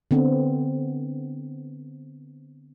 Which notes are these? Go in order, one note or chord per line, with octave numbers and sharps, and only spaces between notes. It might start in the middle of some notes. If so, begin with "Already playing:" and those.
D3 B3 C4